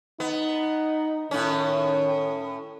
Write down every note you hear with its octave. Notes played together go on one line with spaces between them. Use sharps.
B3 D#4
A2 D#3 C#4